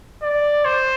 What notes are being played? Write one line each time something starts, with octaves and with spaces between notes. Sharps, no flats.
D5
C5